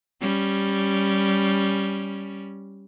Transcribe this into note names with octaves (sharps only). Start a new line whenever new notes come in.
G3 C#4